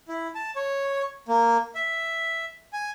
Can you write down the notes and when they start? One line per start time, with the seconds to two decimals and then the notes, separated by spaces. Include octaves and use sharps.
0.08 E4
0.35 A5
0.56 C#5
1.28 A#3
1.75 E5
2.73 G#5